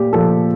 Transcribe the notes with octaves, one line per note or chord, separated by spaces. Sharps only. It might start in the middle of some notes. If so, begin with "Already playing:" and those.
Already playing: A#2 G4
A#2 F3 A4